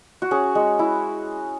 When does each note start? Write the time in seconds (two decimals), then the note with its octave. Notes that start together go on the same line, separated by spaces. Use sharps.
0.22 F#4
0.31 C#4 G#4
0.55 G#3
0.79 E4